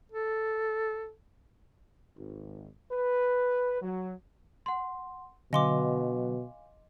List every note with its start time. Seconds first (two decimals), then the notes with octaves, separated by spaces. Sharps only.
0.12 A4
2.17 G#1
2.91 B4
3.82 F#3
4.66 F#5 C6
5.53 B2 D3 F#3 D#5 F5 G#5 C6 D6